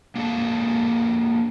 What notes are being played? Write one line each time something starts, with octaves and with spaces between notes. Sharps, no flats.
A#3 D4 G#4 A4 A5